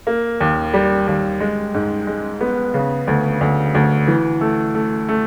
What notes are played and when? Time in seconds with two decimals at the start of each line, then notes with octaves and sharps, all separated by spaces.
0.07 A#3
0.40 D#2
0.74 G3
1.07 D#2
1.40 G#3
1.74 G#2
2.07 G#3
2.41 B3
2.74 C#3
3.07 D2
3.41 D2
3.75 D2
4.07 E3
4.41 A3
4.75 A3
5.09 A3